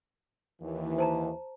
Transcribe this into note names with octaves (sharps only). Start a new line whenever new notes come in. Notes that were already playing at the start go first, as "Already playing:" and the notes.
D#2 E3
C5 A5 A#5